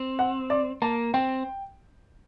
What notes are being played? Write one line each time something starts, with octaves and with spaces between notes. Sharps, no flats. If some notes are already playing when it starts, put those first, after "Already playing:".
Already playing: C4
F#5
D5
A#3 A5
C4 G5